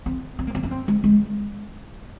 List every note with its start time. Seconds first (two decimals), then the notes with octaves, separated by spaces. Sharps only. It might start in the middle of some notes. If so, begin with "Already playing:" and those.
0.06 C4
0.39 C4
0.47 A#3
0.55 C4
0.63 C#4
0.71 C4
0.88 G#3
1.04 G#3